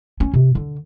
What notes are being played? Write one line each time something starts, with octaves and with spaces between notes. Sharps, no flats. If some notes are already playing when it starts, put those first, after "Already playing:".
C#4
C3
D3